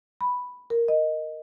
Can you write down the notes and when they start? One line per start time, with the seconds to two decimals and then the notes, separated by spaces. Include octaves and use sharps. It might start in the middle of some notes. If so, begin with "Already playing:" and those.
0.21 B5
0.70 A#4
0.88 D#5